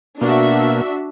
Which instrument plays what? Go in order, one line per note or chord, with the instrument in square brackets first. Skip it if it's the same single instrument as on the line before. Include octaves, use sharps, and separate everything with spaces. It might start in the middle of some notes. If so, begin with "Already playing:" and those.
[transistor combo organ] B2 A#3 [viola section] D4 F#4 E5